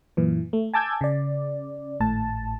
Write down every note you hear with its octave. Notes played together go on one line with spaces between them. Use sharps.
F#2 A#2 E3
A3
G#5 A5 D6 E6 G6 G#6
C#3 D5
G#1 A2 A5